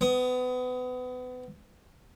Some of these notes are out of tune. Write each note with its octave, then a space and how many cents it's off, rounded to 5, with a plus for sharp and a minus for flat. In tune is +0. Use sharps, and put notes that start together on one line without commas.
B3 +30 D#6 +0